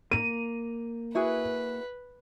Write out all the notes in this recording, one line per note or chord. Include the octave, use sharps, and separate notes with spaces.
A#3 A#5 D#7
E4 F#4 G#4 B4